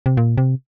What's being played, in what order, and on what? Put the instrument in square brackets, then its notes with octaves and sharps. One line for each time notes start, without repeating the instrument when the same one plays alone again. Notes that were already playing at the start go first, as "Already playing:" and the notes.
[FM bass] C3
A#2
C3